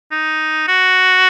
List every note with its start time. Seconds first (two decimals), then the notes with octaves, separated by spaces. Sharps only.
0.12 D#4
0.68 F#4